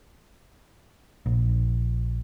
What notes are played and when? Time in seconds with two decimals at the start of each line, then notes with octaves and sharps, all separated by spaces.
1.26 A#1